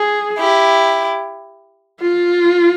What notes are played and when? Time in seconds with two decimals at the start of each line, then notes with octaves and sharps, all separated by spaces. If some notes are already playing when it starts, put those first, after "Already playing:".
Already playing: G#4
0.39 E4 G4
2.02 F4